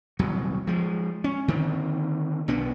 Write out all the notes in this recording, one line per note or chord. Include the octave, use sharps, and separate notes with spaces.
D#1 C2 F#3
F3 G#3
C#4
D3 D#3 A#3 C4
B1 B2 B3 D4